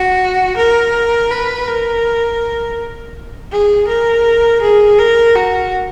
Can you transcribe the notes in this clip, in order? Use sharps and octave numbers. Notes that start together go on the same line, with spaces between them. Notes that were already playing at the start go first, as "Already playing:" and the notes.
Already playing: F#4
A#4
B4
A#4
G#4
A#4
G#4
A#4
F#4